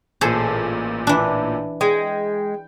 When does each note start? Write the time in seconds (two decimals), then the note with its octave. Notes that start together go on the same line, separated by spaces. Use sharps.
0.21 A1 A#2 G#4 A4 C5
1.07 E3 D4
1.81 G#3 G5